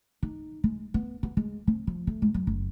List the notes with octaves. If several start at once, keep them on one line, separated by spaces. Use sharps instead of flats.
D#4
G#3
B3
B3
G#3
C4
F3
A3
G#2
F#2
F#1